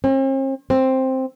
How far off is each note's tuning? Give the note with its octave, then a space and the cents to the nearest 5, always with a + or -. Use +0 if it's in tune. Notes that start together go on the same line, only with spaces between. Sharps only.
C4 +45
C4 +5